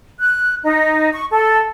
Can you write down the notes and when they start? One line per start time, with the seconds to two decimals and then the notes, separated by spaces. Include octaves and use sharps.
0.19 F#6
0.64 D#4
1.12 C#6
1.31 A4